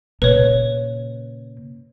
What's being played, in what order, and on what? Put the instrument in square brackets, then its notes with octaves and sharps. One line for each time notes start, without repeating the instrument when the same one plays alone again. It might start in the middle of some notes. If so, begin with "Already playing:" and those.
[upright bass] A#2 C#3 [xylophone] B4 C#5